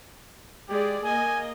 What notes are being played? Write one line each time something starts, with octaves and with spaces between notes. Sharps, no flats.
G#3 G4 G#4 D5
A#3 D#5 G#5